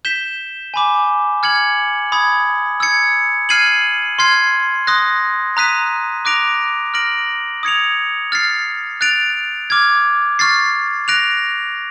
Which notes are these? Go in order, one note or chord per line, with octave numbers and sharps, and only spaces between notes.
G6 B6 E7 G7
G#5 B5 D6
F6 G#6 C#7 F#7
B5 D#6 G#6
E6 G#6 C#7
F6 G#6 C7 D#7 F#7
C6 F6 G#6 C7
C6 D#6 F#6 A#6
A#5 D#6 F#6 B6 D#7
D6 F#6 A#6 D7 F7
F6 A#6 D7 F#7
D#6 G#6 C#7 F7
F6 A6 C7
F#6 A6 D7 F7
D6 F6 G#6
C#6 F6 A6 C7
F#6 A#6 D7 F7